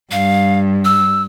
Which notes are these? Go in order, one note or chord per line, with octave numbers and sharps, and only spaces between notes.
G2 F5
E6